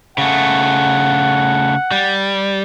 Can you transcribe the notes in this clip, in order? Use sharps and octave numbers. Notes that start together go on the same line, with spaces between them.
C#3 A3 F#5
G3